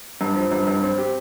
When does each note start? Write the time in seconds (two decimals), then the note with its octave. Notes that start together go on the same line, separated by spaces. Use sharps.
0.21 G2
0.36 F3
0.52 G2
0.67 G2
0.83 C4
0.98 G4